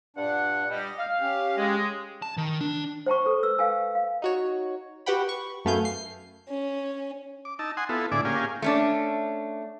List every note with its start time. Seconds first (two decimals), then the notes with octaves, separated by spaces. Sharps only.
0.17 G2 A#2 D4 F#5
0.71 G3 D#5
0.98 F5
1.21 C#4 G4
1.57 G#3
2.22 A5
2.37 D#3
2.61 D4
3.06 C5 G5 A5 C#6
3.25 A4 B4
3.43 B4 E6
3.58 F5 G5 G#5 E6
3.95 F5
4.22 D#4 F#4 C#5
5.06 F#4 G4 B4 F#5 G5 B5
5.28 B4 C#6
5.65 F#2 A3 B3 F5 G#5 G6
5.85 C7
6.48 C#4
7.45 D6
7.59 D#4 A5 E6
7.77 F#5 G#5 C6 D#6
7.89 B3 E4 F4 A4
8.12 A2 D3 E4 G#4 D5 D6
8.25 A#3 C#4 G4 G#4 F5
8.62 A3 C#4 D4